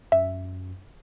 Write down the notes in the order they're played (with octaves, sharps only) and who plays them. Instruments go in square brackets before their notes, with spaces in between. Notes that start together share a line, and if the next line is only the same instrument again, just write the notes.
[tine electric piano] F#2 [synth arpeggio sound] E5